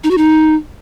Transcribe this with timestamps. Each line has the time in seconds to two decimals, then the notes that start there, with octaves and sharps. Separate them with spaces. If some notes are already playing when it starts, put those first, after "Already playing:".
0.04 D#4
0.11 F#4
0.18 D#4